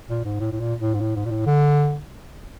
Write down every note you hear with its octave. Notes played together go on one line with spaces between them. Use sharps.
A#2
G#2
A2
A2
A#2
A2
G#2
A2
G#2
A#2
A2
D3